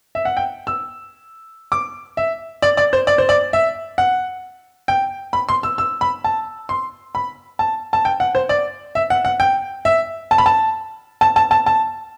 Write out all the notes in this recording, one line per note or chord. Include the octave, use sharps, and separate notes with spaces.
E5
F#5
G5
E6
D6
E5
D5
D5
C5
D5
C5
D5
E5
F#5
G5
B5
C6
E6
E6
B5
A5
C6
B5
A5
A5
G5
F#5
C5
D5
E5
F#5
F#5
G5
E5
A5
B5
A5
A5
A5
A5
A5